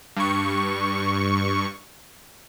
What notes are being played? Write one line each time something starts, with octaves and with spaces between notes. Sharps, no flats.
G2 C#6